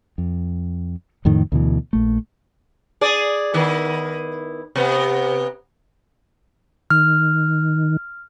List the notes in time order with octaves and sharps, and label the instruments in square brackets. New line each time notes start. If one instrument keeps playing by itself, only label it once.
[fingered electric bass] F2
F2 A2 D#3
D2 B2 E3
A#1 A3
[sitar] G#4 D5
D#3 B3 E4
C3 B3
[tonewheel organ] D#3 [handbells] F6